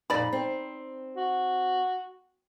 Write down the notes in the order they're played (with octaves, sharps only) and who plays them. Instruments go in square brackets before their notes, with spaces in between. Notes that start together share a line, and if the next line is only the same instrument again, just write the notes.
[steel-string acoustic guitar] F2 A#2 [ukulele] D#4 D5 B5
[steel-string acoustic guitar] C4
[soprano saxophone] F#4